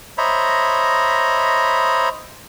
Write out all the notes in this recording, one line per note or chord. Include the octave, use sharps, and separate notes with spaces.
C5 C#5 D#5 E5 A#5 B5